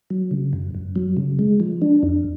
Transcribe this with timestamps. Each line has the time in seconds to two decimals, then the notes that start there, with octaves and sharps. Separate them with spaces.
0.10 F#3
0.31 C#3
0.53 F#2
0.74 F#2
0.96 F#3
1.17 C#3
1.39 G#3
1.60 F3
1.82 D4
2.03 F2